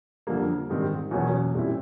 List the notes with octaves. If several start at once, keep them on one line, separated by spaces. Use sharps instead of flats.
F2 D3 G3 A#3
G#2 D#3 G3 C4
E2 B2 F#3 A#3 C#4
A#2 G3 C4 E4